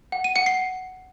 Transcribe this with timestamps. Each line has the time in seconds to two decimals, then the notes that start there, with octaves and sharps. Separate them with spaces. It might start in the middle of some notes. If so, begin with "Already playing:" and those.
0.12 F#5
0.24 D#7
0.35 F#5 C#7
0.46 C7